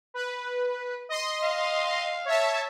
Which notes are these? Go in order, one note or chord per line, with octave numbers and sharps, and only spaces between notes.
B4
D#5 C6
F5
C#5 E5 A5